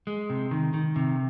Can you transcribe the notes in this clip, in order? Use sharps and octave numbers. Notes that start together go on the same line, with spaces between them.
G#3
C3
D#3
D#3
C3